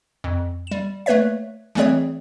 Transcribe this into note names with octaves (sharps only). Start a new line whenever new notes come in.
F2
G3 E7
A3 A#3 B4 C#5 E5
E3 G3 A3 C4 G#4 C#5